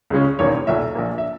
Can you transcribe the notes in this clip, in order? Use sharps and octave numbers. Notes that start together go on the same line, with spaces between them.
C#2 C#3 G#3 C#4
E1 E2 D#3 A#3 C#5
B1 A#2 F#3 E5
A#1 A#2 A#3
E5